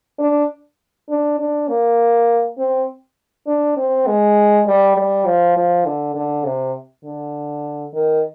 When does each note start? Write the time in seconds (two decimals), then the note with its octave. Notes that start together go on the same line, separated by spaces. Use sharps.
0.19 D4
1.09 D4
1.39 D4
1.68 A#3
2.58 C4
3.47 D4
3.77 C4
4.07 G#3
4.67 G3
4.97 G3
5.26 F3
5.56 F3
5.86 D3
6.15 D3
6.45 C3
7.05 D3
7.94 D#3